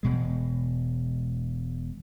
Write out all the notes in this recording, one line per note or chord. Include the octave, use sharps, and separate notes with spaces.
E1 B2 G#3